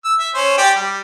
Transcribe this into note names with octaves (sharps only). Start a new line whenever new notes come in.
E6
E5
C#4 C5
G4 D5
G3